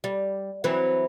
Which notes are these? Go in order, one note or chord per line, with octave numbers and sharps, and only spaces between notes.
G3
E3 F#3 C4